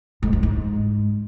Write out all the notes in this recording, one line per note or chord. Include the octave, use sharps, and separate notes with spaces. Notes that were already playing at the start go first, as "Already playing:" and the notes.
G#2
F#2
G#2